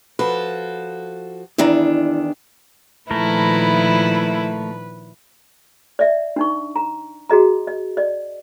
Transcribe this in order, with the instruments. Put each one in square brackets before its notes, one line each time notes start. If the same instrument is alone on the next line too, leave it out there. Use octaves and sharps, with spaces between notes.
[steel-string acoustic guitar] F3 F#4 A4 [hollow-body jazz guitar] B4
[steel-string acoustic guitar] E2 D#3 D4 [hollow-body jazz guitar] E4 A#5
[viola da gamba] A#2 D#3 F3 [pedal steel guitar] A3 A#4 [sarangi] E4 [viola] B4
[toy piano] D5 E5
D4 D#4 C#6
A#5
F#4 G#4 D#5 A#5
D#5
D5 D#5